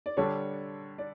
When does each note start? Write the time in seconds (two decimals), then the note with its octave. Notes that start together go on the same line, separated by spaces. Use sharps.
0.06 D5
0.17 D3 G3 D4 A4 C#5
0.98 D5